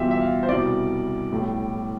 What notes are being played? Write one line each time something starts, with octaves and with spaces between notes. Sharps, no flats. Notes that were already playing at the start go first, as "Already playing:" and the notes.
Already playing: E2 B2 G3 F4 G4 E5
E5
F5
C5
C2 B2 G3 D5
B1 A2 G3